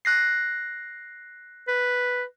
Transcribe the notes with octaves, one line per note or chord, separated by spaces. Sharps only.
F#6 A#6 C7
B4